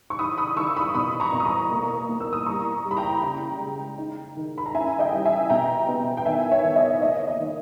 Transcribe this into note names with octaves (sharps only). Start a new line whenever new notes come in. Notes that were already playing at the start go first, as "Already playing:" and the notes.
C#6
D#4 B5 D#6
B5 D#6
D#3 C#6 E6
B5 D#6
B2 B5 D#6
A#5 C#6
B2
D#6
A#5 C#6
A#3
A#3
E6
D#6
G3 A#5 C#6
G3
B5
G5 A#5
C#3 G5 A#5
G#3
D#4
D#3
B5
A#5
C#4 E5 G#5
D#5 G5
G3
E5 G#5
B2 G5 A#5
B3
G5
D#3 E5 G#5
C#5 E5
D#3
D#5
A#3 D#5
D#5
D#3